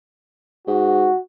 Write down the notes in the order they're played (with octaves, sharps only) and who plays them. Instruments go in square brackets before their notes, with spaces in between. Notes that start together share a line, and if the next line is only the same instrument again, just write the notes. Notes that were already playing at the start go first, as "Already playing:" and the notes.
[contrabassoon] G#2 [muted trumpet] F#4